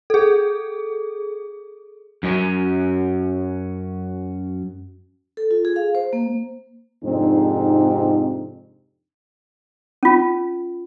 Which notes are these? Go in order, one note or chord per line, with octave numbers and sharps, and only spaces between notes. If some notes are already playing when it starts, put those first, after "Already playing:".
G#4 A4
F#2 F#3 C#4
A4
F4
G#4
F5
C5
A#3
F2 G#2 C3 C4 D4 D#4
C#4 F4